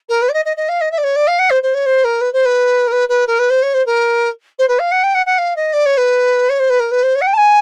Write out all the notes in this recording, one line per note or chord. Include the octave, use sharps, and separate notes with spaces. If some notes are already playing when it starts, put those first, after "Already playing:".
A#4
B4
D5
D#5
D#5
D#5
F5
D#5
E5
D5
C#5
D5
F5
F#5
C5
C5
C#5
C5
A#4
B4
C5
B4
A#4
B4
B4
A#4
B4
C5
C#5
C5
A#4
C5
B4
F5
F#5
G5
F#5
F#5
F5
D#5
D5
C#5
B4
C#5
C5
B4
A#4
B4
C5
C#5
F#5
G5
A5
G#5